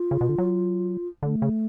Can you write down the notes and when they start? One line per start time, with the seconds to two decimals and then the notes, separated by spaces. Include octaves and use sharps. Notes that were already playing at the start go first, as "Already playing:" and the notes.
Already playing: F4
0.11 C#3
0.21 B2
0.29 D3
0.38 F#3
1.23 D3 A3
1.42 C#3